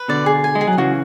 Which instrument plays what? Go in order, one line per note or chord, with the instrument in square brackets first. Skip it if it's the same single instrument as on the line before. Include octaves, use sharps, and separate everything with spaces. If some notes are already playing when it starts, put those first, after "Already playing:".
Already playing: [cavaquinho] B4
[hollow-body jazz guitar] B2 D3 [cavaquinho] D5
[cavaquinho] G#4
G#5
[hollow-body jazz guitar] G#3
[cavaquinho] G#4
[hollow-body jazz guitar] F#3
[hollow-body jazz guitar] C#3 E3 [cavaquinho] F#4